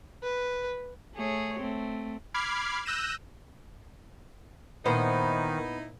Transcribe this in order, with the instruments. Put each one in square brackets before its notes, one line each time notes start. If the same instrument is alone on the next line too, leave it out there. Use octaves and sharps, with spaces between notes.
[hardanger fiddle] B4
[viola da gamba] A3 G#4 C#5
A3 C4
[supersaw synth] B5 D6 F6 G#6 C7
E6 F#6 G6 A#6 D#7 E7
[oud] A#2 C5 [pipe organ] D#3 [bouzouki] B3 [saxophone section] D#4 E4